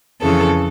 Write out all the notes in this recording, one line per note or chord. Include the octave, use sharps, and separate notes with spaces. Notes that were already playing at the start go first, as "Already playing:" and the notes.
F2 C#3 E3 A4